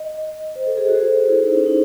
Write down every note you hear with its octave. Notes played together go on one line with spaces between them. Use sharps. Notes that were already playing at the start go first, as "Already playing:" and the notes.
Already playing: D#5
C5
A4
G#4
F#4
C5
A4
G#4
E4
D#4
C#4
D#4